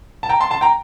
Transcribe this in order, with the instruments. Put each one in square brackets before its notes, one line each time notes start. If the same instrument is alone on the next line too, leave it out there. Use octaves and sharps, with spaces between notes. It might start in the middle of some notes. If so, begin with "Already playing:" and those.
[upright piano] A5
G5 A#5
A5 C6
A5 C6
G5 A#5